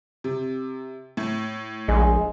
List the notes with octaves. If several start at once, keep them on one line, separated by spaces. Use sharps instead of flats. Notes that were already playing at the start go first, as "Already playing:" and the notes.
C3
A2
A#1 G#3